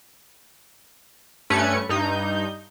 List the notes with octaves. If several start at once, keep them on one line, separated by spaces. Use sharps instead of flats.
G2 A3 C#4 B4 G#6 C#7
G2 D#4 G6